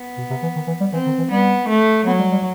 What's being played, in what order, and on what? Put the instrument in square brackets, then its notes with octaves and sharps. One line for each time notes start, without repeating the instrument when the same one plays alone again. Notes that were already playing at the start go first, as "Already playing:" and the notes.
Already playing: [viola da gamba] B3
[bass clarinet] B2
C3
E3
D#3
E3
G3
[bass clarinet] E3 [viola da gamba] C4
[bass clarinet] D#3
E3
[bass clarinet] G3 [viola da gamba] B3
[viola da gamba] A3
[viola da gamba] F#3 [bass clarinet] B3
[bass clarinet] G3
G3